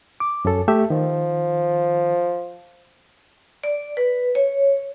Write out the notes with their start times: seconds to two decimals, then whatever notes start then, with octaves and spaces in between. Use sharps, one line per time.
0.20 D6
0.45 F#2 C#4 A4
0.68 A3 G4 A4 E5
0.90 D#3 F3
3.64 D5
3.97 B4
4.35 C#5